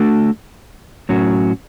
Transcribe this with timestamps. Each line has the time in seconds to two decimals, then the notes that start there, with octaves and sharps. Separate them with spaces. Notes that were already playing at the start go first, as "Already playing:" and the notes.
Already playing: A3 D4 F#4 A4
1.09 A2 F#3 C#4 F#4